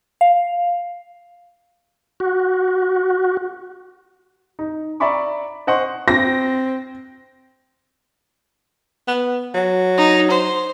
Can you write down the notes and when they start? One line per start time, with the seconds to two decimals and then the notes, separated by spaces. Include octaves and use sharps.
0.21 F5
2.20 F#4
4.59 D#4
5.00 D5 E5 A#5 B5 C#6 D6
5.67 C5 D#5 F#5 C6 C#6
6.08 C4 A#6
9.08 B3
9.54 F#3
9.97 D#4
10.31 C5